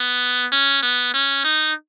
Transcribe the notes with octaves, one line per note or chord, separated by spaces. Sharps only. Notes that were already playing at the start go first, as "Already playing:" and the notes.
Already playing: B3
C#4
B3
C#4
D#4